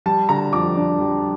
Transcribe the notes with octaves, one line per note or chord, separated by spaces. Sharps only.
G3 A5
D3 A#5
F2 D6
D4
G3